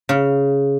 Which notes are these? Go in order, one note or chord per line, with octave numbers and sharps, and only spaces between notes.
C#3